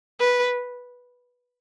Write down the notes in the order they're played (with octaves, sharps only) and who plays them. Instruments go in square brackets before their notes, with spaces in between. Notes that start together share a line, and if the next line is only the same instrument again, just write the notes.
[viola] B4